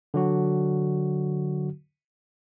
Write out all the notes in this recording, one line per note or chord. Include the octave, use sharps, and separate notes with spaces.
D3 F#3 F#4